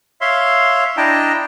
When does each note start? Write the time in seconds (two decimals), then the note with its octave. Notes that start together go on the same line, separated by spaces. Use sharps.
0.21 C#5 E5 F5 C6
0.97 D4 E4 D#5 G5 A5 A#5